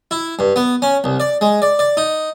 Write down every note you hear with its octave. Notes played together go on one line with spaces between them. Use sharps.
E4
G2
B3
C#4
C2
D5
G#3
D5
D5
D#4